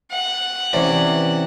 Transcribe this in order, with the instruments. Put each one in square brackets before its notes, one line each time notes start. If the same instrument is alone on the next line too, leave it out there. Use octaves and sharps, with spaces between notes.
[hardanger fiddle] F#5
[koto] C3 C#4 [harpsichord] E3 D5